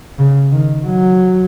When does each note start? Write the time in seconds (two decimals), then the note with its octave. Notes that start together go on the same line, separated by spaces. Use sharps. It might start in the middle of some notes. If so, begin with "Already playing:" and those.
0.19 C#3
0.52 D#3
0.86 F#3